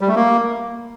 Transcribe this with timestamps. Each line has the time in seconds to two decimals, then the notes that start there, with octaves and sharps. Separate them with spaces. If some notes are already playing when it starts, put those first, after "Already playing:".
0.01 G3
0.08 A3
0.16 A#3